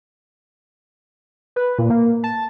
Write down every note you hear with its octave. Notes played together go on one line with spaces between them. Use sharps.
B4
A#2
A#3
A5